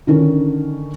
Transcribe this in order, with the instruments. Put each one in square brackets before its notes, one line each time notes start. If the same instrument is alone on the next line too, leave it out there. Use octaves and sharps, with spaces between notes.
[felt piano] D3 D#3 C#4